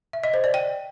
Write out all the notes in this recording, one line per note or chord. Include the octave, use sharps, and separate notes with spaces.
E5
D#5
C5
D5
G5